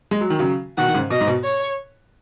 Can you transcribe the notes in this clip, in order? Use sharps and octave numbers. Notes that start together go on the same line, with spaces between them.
G#3
F#3
D#3
C#3 F#3
B2 D#3 F#5
D#3
G#2 C#3
B2 D#5
G#2
B2
C#5